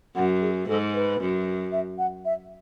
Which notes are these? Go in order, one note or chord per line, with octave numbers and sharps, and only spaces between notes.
F#2 F#5
G#4
G#2 A4
B4
F#2
E5
F#5
E5